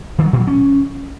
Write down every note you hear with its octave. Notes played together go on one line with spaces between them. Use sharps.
D#3
F#3
A#2
F#3
C#4